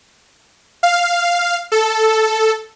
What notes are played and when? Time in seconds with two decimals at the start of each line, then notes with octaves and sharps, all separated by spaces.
0.83 F5
1.72 A4